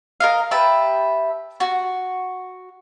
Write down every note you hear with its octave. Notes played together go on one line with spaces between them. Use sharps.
A#4 D#5 F5
G4 B4 E5 A5
F#4